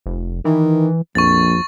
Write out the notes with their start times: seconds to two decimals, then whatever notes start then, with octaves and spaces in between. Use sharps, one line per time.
0.06 F1
0.45 D#3 E3
1.15 A#1 F2 C#6 A6